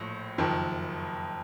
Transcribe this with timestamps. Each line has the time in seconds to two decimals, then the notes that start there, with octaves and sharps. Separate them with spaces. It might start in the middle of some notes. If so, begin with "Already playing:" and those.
Already playing: A#1 A2
0.38 F#1 F2 D#3